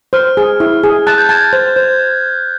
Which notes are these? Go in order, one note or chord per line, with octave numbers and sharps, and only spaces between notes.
C5 F6
G#4
E4
G#4
A5 F#6
G6
A5 G#6
A6
C5 A6
C5 G6